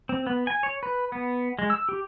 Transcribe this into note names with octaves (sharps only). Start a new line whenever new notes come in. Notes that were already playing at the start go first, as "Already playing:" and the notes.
C4
B3
G#5
C#5
B4
B3
G#3
E6
G4